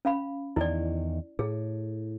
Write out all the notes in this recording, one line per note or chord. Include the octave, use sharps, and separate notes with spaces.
C#4 F5 B5
E2 D#3 E4 D5
A2 G#4